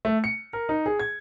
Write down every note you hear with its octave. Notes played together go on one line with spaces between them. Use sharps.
A3
C#7
A#4
D#4
G#4
G#6